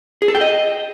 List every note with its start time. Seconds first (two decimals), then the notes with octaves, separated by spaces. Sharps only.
0.22 G#4
0.28 A4
0.35 G5
0.41 D#5